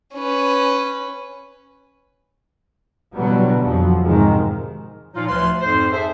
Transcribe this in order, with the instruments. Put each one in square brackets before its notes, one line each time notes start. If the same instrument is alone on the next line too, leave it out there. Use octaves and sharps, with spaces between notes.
[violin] C#4 B4
[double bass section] B2 D3 E3 F#3 G3 B3
F2 F3 F#3
G#2 C3 D#3 G#3
[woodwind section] A#2 F3 F#3 D#4 F4
D2 F3 B4 C6
F2 G#2 C5
G#4 A4 C5 E5